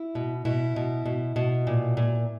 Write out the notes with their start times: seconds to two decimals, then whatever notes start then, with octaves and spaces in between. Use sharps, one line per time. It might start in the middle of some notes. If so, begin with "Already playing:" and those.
Already playing: E4
0.15 B2
0.45 B2 E4
0.76 B2
1.06 B2
1.36 B2
1.67 A#2
1.97 A#2